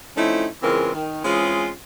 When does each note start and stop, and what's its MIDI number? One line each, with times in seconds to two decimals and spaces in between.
0.17 0.46 53
0.17 0.46 57
0.17 0.46 60
0.17 0.46 61
0.17 0.46 63
0.17 0.46 64
0.63 0.90 49
0.63 0.90 52
0.63 0.90 56
0.63 0.90 60
0.63 0.90 65
0.63 0.90 70
0.94 1.23 51
1.24 1.70 52
1.24 1.70 56
1.24 1.70 60
1.24 1.70 61
1.24 1.70 65
1.24 1.70 68